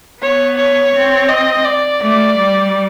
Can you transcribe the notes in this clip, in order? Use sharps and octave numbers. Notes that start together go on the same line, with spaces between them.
B3 C#5
C#5
C4
D#5
D5
A3 D5
G3